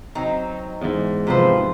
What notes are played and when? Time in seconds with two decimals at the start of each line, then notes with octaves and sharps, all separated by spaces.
0.15 F#3 C4 D#4
0.82 E2 G#2
1.27 C3 F3 B4 C5